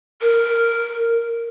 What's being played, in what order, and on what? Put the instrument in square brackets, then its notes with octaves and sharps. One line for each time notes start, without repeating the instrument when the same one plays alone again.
[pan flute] A#4